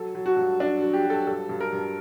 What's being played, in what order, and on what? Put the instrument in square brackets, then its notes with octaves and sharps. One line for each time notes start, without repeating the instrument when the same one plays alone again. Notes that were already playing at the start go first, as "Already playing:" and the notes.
Already playing: [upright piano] F#3 A4
F#3
F#4
G2
F#3 D4
F#3
G4
F#3
A4
G2 A4
G2
A#4
G2